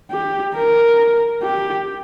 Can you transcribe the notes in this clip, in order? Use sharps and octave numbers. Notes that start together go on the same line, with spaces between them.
G4
A#4
G4